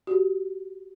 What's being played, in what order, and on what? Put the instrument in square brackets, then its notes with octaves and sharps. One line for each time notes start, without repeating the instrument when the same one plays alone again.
[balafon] F#4 G4